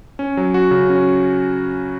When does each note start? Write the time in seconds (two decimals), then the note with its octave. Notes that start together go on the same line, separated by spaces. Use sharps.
0.19 C#4
0.37 F#3
0.54 F#4
0.71 C#3
0.90 C#4